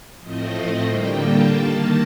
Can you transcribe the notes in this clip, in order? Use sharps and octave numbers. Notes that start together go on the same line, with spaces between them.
A2 F3 A3 C4 D#5
D3 G3 A#3 G5
A5
D#3 A#3 A5